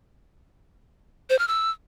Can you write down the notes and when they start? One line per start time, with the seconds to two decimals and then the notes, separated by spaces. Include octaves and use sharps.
1.30 C5
1.39 F6
1.48 E6